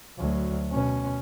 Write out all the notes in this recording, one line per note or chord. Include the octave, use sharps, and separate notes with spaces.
D2 F#3
B2 C#4